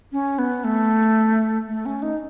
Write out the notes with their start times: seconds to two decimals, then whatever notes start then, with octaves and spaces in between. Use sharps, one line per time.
0.12 C#4
0.39 B3
0.64 A3
1.68 A3
1.86 C#4
2.02 D#4